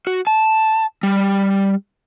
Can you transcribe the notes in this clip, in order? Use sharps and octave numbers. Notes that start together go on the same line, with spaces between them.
F#4
A5
G3